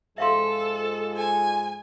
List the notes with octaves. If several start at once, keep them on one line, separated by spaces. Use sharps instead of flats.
G#2 F3 G#3 A4 E5 F5 C6
G#5